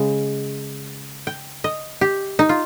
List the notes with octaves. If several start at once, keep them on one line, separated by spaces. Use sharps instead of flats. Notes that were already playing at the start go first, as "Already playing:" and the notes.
Already playing: C#3 G#3
G5
D#5
G4
D#4
F4